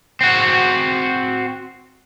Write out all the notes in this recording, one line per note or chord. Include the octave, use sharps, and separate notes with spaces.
C4 F#4